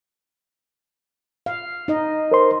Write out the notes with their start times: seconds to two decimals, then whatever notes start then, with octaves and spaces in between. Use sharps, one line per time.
1.46 F5
1.88 D#4 D#5
2.31 A#4 C5 C6